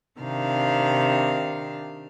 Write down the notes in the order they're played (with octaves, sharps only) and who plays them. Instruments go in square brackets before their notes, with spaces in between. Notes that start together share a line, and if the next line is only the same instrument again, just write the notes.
[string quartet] C3 D#3 D4 F5